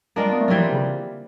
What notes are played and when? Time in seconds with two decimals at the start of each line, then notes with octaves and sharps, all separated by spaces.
0.16 G#3 A#3 D4 F4 A#4
0.24 G3
0.32 B3
0.40 A3
0.48 E3 F#3 G3 C4 F4
0.56 F3
0.73 C#3